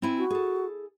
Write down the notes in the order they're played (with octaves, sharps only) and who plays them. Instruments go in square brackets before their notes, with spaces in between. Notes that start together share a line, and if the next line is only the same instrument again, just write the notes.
[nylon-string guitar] C4 E4 G#5
[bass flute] F#4
[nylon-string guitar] G#4 A4